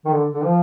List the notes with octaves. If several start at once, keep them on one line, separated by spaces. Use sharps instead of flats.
D#3
D3
D3
F3